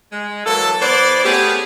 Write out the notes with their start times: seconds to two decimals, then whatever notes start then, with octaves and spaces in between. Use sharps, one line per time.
0.12 G#3
0.45 E3 F#3 A#3 A4
0.81 E3 B3 B4 C5 D5
1.24 A3 B3 C#4 G4 G#4